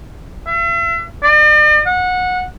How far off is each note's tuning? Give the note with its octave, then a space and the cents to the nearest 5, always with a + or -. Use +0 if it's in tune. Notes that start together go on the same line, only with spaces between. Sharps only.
E5 +40
D5 +45
F#5 -20